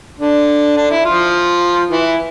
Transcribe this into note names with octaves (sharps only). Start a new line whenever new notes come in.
D3 D4
D4
E4
F3 F4
E3 E4